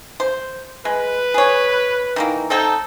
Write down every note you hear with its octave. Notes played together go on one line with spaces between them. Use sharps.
C5
G#3 B4
G#4 C#5
D#3 E3 A#3
C4 D#4 A4 G5